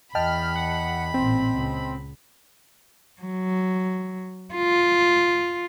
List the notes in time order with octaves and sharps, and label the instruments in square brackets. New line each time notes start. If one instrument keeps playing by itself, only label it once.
[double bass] E2 [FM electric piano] D#5 G5 A5 [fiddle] B5 [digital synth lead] F6
[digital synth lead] F#5
[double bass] A1 A#2 [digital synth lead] C4
[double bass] C#2
[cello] F#3
F4